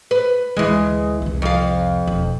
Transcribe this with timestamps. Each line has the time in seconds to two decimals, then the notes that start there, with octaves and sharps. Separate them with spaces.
0.11 B4
0.57 D2 E3 G#3
1.22 F1 C2
1.42 F2 F5
2.07 E1